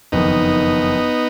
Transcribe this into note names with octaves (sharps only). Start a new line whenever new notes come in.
F#1 F2 D#3 B3 D#4